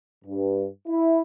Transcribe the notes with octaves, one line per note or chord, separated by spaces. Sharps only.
G2
E4